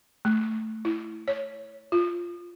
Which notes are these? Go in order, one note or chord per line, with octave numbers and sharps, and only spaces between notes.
A3
E4
C#5
F4